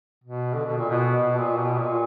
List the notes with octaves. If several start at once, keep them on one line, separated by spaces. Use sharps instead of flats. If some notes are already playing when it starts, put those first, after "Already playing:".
B2
D3
B2
A#2
B2
B2
A#2
B2
A#2